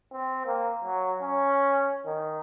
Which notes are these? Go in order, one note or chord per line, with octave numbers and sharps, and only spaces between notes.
C4
A#3
F#3
C#4
D#3